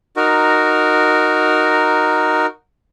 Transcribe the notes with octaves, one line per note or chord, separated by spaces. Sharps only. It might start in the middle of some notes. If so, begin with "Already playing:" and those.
D#4 F#4 A#4